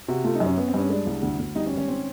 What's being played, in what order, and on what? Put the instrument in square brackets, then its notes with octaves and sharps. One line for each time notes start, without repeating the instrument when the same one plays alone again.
[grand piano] C3 [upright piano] F#4
[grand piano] A3 [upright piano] F4
[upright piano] D#4
[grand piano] F#2
[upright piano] C#4
[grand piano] B3 [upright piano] C#4
[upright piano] C4
[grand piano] G2 [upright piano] C#4
[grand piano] G#3 [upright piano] D4
[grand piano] C2
D2
D2
[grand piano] G3 [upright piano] D#4
[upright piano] C#4
[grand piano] G#1
[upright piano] C#4
[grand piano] C4